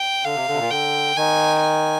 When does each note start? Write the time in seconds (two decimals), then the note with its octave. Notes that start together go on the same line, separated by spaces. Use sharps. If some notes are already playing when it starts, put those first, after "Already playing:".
Already playing: G5
0.25 D3 F5
0.36 C3
0.48 D3
0.54 C3
0.60 A#2
0.71 D3 G5
1.17 D#3 G#5
1.62 G#5